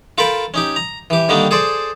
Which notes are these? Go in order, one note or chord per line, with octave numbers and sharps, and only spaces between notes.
F4 A4 A#4 G5 B5
C#4 D#4 G4
A#5
E3 G4
D3 D#3 G3 A#3 D4 D#4
G#4 A4 C5 D5